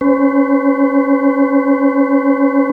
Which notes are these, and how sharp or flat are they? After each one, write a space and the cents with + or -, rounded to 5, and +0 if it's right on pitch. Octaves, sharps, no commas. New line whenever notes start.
C#4 +0 C5 -45